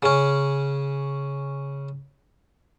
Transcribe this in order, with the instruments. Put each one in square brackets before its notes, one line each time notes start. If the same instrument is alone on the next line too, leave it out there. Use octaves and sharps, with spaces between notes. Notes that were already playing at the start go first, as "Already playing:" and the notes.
[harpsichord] C#3 C#4